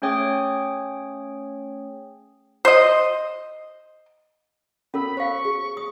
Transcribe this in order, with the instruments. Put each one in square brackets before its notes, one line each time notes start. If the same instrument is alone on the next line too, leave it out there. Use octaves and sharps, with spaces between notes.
[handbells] A3 C#4 G#4 C#5 G5 D#6
[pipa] C5 D#5
[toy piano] C#4 A4 A#4 [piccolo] B5
[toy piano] C5 F5 [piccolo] C#6
[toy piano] G#4
D#6